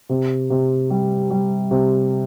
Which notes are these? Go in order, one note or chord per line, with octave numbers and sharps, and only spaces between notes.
C3
C3
G3
G3
C3